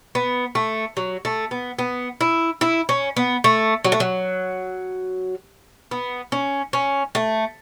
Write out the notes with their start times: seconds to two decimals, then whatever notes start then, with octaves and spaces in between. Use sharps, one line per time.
0.15 B3
0.55 A3
0.97 F#3
1.25 A3
1.51 B3
1.79 B3
2.21 E4
2.61 E4
2.89 C#4
3.17 B3
3.44 A3
3.85 F#3
3.92 A3
4.00 F#3
5.91 B3
6.32 C#4
6.73 C#4
7.15 A3